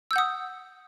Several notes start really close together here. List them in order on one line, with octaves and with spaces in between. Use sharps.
E6 G6 F#5 D#6